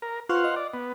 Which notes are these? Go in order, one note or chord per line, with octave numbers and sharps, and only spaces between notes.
A#4
F4 B4 C5 F5 F#5 C#6
D#5
D5
B3